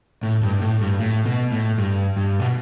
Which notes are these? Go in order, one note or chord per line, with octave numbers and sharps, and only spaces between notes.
A2
G2
A2
G2
A2
B2
A2
G2
G2
B2